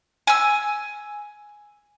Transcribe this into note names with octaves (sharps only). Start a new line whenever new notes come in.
G#5 E6